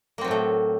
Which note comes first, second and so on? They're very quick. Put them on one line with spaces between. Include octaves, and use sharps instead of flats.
A#3 C4 F#3 A2 A3